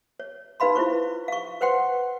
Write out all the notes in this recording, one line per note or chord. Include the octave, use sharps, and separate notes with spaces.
C#5
D#4 B4 F5 B5 C6
E4 F4 C5 C#6
F5 C#6
B4 C5 F#5 G5 C6